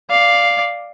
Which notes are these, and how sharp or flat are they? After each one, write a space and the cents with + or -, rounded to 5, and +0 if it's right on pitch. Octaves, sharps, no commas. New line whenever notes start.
D5 +0 F5 +0